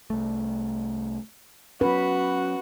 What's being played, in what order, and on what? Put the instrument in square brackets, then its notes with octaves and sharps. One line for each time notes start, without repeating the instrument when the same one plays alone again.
[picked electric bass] C2 A3
[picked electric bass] F#3 C#4 [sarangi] F#4 [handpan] B4